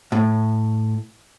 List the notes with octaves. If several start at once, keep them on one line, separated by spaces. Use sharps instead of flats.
A2